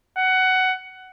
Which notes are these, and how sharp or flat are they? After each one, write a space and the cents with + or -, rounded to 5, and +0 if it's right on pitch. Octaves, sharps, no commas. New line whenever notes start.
F#5 +15